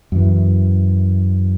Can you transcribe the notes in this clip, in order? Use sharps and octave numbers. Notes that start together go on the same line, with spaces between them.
F#2 E3